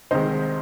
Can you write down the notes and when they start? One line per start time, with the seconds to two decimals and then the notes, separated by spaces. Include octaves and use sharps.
0.11 C2 C3 D#3 G#3 C5 D#5